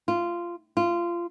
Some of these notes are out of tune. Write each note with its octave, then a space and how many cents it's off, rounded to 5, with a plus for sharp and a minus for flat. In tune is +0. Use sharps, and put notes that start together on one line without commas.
F4 -15
F4 -20